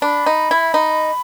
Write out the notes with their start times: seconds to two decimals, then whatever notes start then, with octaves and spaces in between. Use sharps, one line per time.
0.02 D4 B5
0.26 D#4
0.51 E4
0.74 D#4